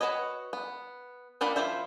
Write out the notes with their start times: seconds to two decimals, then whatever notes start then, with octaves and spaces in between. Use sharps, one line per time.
0.01 F#4 A4 B4 C#5 D#5
0.53 B3
1.41 A#3 D4 F4 F#5 B5
1.56 F3 E4 F4 C5 E5